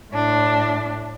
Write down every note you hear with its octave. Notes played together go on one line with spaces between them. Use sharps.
A2 D4